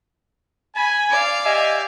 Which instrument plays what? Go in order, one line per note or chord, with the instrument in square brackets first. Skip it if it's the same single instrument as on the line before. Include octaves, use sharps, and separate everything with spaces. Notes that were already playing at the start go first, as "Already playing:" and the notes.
[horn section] G#5 [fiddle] B5
[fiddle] D5 F5
[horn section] G4 E5 G#5 [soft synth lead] D#5